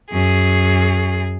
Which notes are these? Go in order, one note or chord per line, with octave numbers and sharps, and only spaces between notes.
F#2 G#4